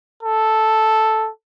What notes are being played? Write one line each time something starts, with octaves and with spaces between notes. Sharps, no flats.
A4